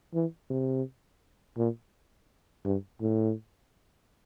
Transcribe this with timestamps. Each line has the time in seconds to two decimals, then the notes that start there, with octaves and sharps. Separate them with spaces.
0.14 E3
0.50 C3
1.57 A#2
2.65 G2
3.01 A2